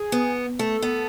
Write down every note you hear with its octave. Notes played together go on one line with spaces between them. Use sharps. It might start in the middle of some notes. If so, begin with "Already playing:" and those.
Already playing: G#4
B3
A3 A4
B3